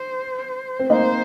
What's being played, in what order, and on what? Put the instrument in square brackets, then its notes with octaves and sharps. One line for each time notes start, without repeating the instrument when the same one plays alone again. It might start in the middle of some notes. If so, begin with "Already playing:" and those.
Already playing: [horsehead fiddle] C5
[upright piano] C4
[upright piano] A#3 D#4 [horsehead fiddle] C5